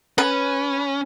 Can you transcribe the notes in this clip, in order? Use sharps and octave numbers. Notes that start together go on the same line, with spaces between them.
C#4 B4